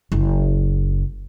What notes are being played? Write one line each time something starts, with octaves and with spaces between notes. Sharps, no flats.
F#1